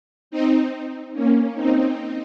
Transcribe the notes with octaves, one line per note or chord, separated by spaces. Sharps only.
C4 D#4
A#3 C#4
C4 D#4